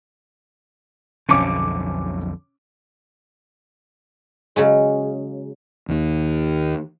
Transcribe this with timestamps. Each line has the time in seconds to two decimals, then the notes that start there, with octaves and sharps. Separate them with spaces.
1.29 B1 F2 D3 C#4 D6
4.56 C#3 F#3 G#3
5.88 D#2 D#3